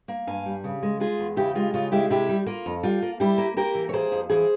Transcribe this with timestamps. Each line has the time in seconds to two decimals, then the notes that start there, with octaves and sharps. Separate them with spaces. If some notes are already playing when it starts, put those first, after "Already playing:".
0.08 A#3
0.27 G2 F5 G#5
0.46 G3
0.64 C#3
0.83 G#3
1.00 G#3 F4 G#4
1.19 E2
1.36 C#3 E4 G4
1.55 G#3 F4
1.74 C#3 F4
1.92 G#3 E4 G4
2.10 C3 E4 G4
2.29 G3
2.46 A#3 F4
2.66 F2
2.83 G3 F4
3.02 A#3
3.20 G3 E4 G4
3.38 A#3
3.57 A#3 G4 A#4
3.75 E3
3.89 C#5
3.93 A#3 G#4 C5
4.12 F2
4.30 E3 G#4 C5